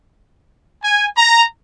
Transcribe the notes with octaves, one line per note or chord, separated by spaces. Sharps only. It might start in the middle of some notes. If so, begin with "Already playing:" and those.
G#5
A#5